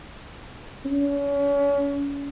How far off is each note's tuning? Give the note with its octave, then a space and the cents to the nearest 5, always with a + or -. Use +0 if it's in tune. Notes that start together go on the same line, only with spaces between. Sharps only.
C#4 +35